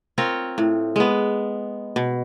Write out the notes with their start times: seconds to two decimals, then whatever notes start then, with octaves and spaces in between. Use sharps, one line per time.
0.18 C4 F4 A#4 C#5
0.58 A2
0.96 G#3 B3
1.96 B2